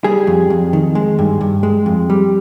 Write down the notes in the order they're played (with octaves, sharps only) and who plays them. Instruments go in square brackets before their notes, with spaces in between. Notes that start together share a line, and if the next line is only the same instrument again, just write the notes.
[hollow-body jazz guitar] G3 G#4
F2
F2
D#3
G#3
G2
G2
G#3
F2
G3